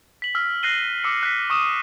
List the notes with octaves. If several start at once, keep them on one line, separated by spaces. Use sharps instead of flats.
B6 F#7
E6 F6 B6
F#6 A#6 C7 D#7 G7
D6 E6 C#7
F#6 B6
C#6 D#6 D#7 E7